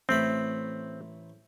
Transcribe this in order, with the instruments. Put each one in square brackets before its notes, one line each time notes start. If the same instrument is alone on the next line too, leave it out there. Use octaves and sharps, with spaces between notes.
[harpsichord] A1 A3 B5 [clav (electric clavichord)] C4